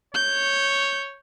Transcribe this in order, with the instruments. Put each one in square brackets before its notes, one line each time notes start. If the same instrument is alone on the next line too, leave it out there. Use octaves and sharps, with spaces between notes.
[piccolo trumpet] C#5 [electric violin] G6